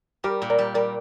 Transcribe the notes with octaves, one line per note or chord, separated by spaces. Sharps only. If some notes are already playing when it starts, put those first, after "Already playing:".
G3 G4 A#4
A#2
A#4 D5
G3
G3 A#4 D5